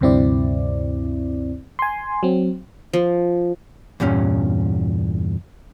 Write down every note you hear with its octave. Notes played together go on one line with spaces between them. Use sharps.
D2 G2 C3 C4 E4 D5
G#5 C6
F#3 C4
F3
E2 G2 A#2 C#4